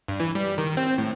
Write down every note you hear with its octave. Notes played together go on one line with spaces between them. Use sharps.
G2
E3
G3
D#3
C4
A2